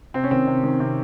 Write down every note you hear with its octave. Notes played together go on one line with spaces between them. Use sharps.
C3 C4
C#4
D#3 C4
C3
D#3
C3